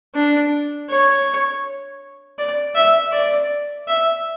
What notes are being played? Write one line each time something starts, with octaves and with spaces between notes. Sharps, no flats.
D4
C#5
D5
E5
D5
E5